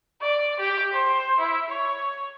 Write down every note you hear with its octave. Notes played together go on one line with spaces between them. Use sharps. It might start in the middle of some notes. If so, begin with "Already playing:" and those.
D5
G4
C5
E4
C#5